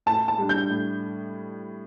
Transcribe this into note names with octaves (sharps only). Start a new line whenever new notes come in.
A2 A5
A5
G3 D4
G6
A2